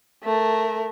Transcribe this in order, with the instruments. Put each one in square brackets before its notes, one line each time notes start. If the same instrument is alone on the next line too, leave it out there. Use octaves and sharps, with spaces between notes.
[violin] A3 A#4